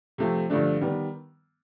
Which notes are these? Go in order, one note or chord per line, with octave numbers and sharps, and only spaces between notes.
C3 F3 A3 C4
G2 D3 F3 A3 D4
D#3 G3 B3